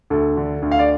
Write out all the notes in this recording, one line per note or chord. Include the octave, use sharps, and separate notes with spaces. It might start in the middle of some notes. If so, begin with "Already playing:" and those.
D2 A4
D3
D2
F5
D5